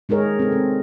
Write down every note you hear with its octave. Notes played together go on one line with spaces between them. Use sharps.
G#3 D#4 G#4 A#4 C#5
C4 A4
C4